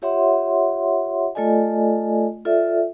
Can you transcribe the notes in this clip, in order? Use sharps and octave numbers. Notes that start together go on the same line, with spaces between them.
F4 G4 C#5 E5 F#5 C6
A3 F4 A4 D5 D#5 G#5
F4 A4 D5 E5